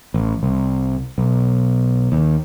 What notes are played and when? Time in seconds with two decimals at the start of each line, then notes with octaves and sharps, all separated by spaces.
0.14 A1
0.43 C2
1.18 B1
2.12 D#2